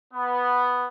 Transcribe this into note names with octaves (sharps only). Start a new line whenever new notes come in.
B3